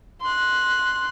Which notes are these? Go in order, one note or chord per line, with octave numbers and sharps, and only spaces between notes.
C6 F#6